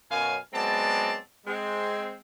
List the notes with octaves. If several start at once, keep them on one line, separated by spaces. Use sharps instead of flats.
F#2 B2 C#4 F5 G#5
F#3 G#3 B3 C4 D5 A5
G#3 C4